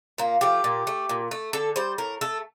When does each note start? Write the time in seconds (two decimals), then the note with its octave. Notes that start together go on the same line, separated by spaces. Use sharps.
0.18 A#2 A#3
0.41 F3 A3 G4
0.64 A#2
0.87 A3
1.09 A#2
1.31 A3
1.53 D3 A4
1.76 G3 C5
1.98 A2 A#4
2.21 A3 A4